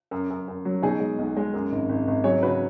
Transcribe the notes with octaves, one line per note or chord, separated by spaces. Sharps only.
F#2
F#2
F#2
F#3
B2 D#4 G#4
G#3
B1
G#3
F#2
G#1
G#1
G#1
F#3 G#4 C#5
C#3 F#4 B4